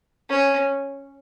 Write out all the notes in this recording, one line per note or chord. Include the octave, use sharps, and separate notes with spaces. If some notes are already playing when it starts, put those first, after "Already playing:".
C#4